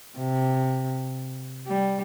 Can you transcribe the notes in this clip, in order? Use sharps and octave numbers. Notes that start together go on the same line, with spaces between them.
C3
G3